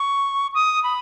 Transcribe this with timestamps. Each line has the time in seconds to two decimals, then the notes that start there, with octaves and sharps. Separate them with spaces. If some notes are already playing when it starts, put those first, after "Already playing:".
Already playing: C#6
0.54 D#6
0.84 B5